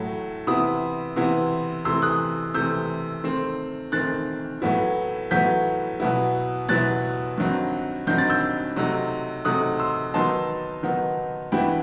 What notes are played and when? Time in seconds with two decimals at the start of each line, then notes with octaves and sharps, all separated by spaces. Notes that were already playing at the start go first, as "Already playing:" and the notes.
Already playing: A2 F#3 A3 E4
0.47 C3 E3 B3 E4 B5 D#6
1.16 C3 E3 B3 E4
1.85 C3 E3 A3 C6 E6
2.02 D#6 F#6
2.54 C3 E3 A3 E6 G6
3.24 D#3 A3 C4
3.92 D#3 A3 C4 F#6 A6
4.62 A2 F#3 B3 E4
5.31 A2 F#3 B3 E4 G6 B6
6.00 B2 F#3 B3 E4
6.69 B2 F#3 B3 E4 F#6 A6
7.38 G2 D#3 F#3 C4 D#4
8.07 G2 D#3 F#3 C4 D#4 G6
8.18 A6
8.30 E6 G6
8.76 C3 F#3 A3 D#4
9.45 C3 F#3 A3 D#4 D#6 F#6
9.79 C6 E6
10.14 D#3 F#3 B3 D#4 A5 C6
10.83 D#3 F#3 B3 D#4
11.52 G2 E3 B3 E4 G5 B5